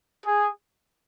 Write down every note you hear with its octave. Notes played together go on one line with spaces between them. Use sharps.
G#4